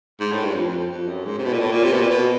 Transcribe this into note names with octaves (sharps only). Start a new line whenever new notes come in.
G#2
A2
G2
F2
F2
F2
F2
F#2
G#2
C3
B2
A#2
A2
A#2
C3
B2
A#2
B2